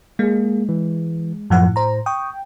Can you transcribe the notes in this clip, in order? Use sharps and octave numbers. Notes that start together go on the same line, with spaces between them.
G#3 A#3 G#4
E3
F#2 A2 F3 F#5
C5 A#5
G5 C#6 D#6